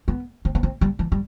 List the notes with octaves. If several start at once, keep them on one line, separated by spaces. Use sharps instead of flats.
B3
C4
B3
C4
G3
E3
G3